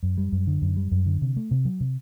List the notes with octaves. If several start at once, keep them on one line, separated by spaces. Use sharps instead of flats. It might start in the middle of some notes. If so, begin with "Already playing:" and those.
F#2
G3
F#2
D3
F#2
G3
F#2
D3
C3
A3
C3
F#3
C3